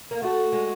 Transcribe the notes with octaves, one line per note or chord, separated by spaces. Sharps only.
A#3
A3 F#4
G#3